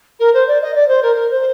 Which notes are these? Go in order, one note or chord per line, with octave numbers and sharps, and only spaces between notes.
A#4
C5
D5
D#5
D5
C5
A#4
A#4
C5